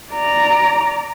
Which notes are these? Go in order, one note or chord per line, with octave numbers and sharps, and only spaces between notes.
D5 A#5